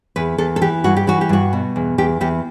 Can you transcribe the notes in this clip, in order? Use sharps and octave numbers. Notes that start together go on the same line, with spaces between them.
E2 B4
E2 A4
A4
E3 G4
G2 F#4
G4
E3 F#4
G4
G2 F#4
B2
E2
E2 G4
E2 G4